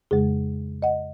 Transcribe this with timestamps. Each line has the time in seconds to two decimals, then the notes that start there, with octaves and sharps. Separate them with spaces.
0.11 F2 C#3 G#3 G#4
0.82 D#5 F#5